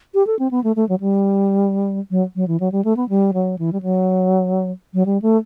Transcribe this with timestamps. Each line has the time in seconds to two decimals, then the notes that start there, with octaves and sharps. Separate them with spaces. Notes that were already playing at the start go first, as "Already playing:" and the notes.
0.14 G4
0.27 A4
0.39 C4
0.51 B3
0.64 A3
0.76 A3
0.89 F#3
1.00 G3
2.11 F#3
2.36 F#3
2.48 E3
2.60 F#3
2.72 G3
2.84 A3
2.96 B3
3.09 G3
3.33 F#3
3.58 E3
3.72 G3
3.82 F#3
4.94 F#3
5.06 G3
5.22 A3